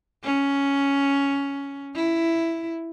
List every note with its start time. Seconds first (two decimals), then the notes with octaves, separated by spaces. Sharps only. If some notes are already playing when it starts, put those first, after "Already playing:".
0.24 C#4
1.95 E4